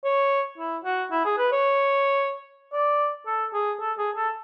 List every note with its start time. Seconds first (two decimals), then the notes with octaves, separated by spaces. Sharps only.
0.04 C#5
0.58 E4
0.85 F#4
1.11 E4
1.25 G#4
1.38 B4
1.52 C#5
2.73 D5
3.27 A4
3.53 G#4
3.80 A4
3.98 G#4
4.16 A4